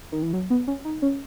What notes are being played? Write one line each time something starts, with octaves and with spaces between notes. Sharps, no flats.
D#3
E3
F#3
B3
C#4
D#4
C#4